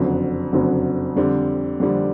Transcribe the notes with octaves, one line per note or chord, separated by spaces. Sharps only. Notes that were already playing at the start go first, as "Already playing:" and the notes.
Already playing: F#1 F2 D3 F#3
F#1 F2 D3 F#3
F2 D3 G3 C4
F2 D3 G3 C4